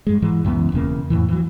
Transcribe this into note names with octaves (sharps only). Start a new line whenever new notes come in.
G2 G#3
G#2 E3 G#3
C#2 F#2 E3 B3
E1 E2 C#3 A#3
F2 A2 E3
E3 F#3